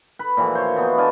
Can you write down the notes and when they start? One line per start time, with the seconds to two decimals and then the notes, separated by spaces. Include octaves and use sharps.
0.19 B4
0.37 A#2 E3 F3 F#4
0.55 C5 C#5
0.76 E3 B3 D#4
0.98 D4 F4 G#5 A5